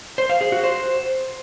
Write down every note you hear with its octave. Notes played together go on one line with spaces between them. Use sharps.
C5
F5
G#4
F#4
C5